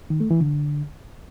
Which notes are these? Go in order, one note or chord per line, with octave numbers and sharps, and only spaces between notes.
D#3
A3
E3
D3